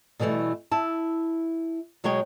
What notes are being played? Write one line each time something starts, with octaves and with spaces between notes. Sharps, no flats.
B2 D3 E3 G3 A3
E4 A5
B2 F#3 G#3 C#5 G5